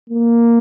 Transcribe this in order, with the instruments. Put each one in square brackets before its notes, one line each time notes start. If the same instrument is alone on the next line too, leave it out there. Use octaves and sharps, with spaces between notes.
[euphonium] A#3